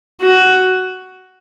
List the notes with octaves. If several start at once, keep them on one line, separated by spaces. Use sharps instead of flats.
F#4